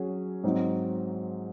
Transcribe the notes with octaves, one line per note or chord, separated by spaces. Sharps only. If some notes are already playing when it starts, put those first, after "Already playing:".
Already playing: F#3 C#4 G#4
G#2 F#3 C4 D#4